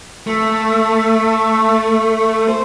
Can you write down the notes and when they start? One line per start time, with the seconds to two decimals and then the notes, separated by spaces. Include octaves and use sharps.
0.27 A3
2.48 C5